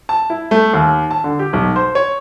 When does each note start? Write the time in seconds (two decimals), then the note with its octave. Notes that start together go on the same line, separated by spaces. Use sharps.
0.09 A5
0.30 E4
0.51 A3
0.73 D#2
1.11 A5
1.24 D3
1.39 G4
1.53 B1
1.76 C5
1.95 C#5